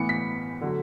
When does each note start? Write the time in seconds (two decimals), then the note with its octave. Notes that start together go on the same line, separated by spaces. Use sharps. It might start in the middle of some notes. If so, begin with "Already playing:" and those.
Already playing: A2 E3 B3 C#7
0.09 B6
0.61 D3 F#3 A3